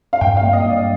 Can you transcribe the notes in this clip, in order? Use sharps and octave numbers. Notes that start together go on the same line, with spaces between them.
F5
G2 G5
F5
A#3
D#5
G2
D5